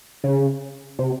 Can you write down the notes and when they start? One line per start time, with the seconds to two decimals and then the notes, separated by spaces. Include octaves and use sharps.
0.24 C#3
0.99 C3